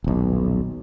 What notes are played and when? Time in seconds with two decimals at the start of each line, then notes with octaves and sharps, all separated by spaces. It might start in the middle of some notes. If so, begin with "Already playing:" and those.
0.04 D#1 B1